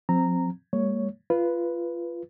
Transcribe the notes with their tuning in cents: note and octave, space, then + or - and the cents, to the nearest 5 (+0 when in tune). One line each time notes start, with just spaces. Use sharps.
F3 +35 C4 +0 A#5 -10
G3 +45 A#3 -20 C#5 +5
F4 -20 B4 +0